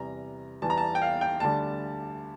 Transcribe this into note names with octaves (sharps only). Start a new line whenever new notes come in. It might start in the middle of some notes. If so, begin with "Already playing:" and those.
Already playing: E2 C3 G3 A#5
E2 E3 G3 A5
A#5
A5
G5
F5
G5
D2 D3 G3 A5